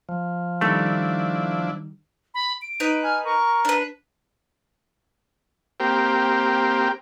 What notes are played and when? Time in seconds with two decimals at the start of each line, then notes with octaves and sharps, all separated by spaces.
0.09 F3
0.61 D#3 G3 A3 D4 E4
2.34 B5
2.62 D7
2.80 D#4 B4
3.04 G#5 F6
3.25 A#4 C#6
3.65 D4 B4
5.80 A#3 C4 G4